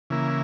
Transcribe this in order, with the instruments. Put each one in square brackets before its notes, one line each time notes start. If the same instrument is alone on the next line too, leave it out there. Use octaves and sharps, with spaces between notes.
[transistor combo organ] C#3 E3 A#3 E4